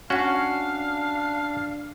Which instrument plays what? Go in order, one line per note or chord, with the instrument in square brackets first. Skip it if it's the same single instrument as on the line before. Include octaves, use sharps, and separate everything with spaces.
[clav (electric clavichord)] C#4 F#4 [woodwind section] D4 [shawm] F5 [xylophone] F#5 C#6